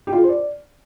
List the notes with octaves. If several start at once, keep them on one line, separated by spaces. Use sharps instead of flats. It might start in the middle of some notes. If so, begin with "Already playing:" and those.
G4
F4
G#4
C5
D5